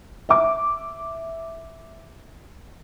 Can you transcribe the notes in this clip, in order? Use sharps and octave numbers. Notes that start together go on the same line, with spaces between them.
E5 D6